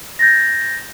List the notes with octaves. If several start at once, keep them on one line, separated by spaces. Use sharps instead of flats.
G6 A6 A#6